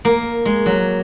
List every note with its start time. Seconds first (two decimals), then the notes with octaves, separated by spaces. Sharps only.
0.05 A#3
0.45 G#3
0.66 F#3